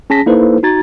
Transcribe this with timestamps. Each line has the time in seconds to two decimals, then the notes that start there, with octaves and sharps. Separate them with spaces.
0.10 C#4 G#4 A5 A#6 B6
0.26 A#3 D#4 E4 A4 B4 C5
0.63 D#4 F#4 A#5 G#6 A6